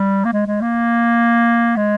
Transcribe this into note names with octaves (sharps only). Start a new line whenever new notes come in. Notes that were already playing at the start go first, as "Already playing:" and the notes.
Already playing: G3
A#3
G#3
G#3
A#3
G#3